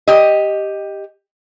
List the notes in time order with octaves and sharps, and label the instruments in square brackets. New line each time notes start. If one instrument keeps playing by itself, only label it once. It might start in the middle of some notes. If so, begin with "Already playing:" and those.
[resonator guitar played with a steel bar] G4 D#5